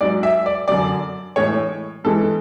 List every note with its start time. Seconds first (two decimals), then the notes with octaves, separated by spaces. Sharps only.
0.01 G#2 F#3 D5
0.23 E5
0.46 D5
0.68 F#2 D3 F#3 D5
1.36 A2 E3 G#3 C#5
2.04 G#2 E3 G#3 A4